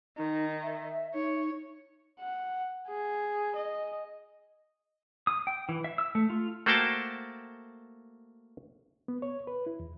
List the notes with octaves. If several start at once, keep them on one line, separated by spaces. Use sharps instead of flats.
D#3 D#4
E5
D#4 C#5
F#5
G#4
D#5
D#6
G5
E3
E5
E6
A3
F4
A3 A#3 F#4 C5 G5 A5
B3
C#5
B4
E4
E2